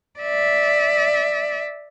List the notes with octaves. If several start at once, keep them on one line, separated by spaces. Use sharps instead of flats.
D5 E5